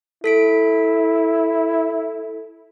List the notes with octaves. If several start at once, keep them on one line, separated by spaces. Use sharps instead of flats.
E4 A4 B6 D7